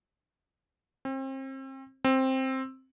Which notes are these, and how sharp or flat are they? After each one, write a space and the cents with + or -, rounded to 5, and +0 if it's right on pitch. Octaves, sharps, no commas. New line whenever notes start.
C4 +35
C4 +10